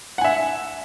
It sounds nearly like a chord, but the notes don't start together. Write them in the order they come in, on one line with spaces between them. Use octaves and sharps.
F#5 G#5 E5